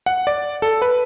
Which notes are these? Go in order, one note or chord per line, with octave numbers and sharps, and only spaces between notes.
F#5
D5
A4
B4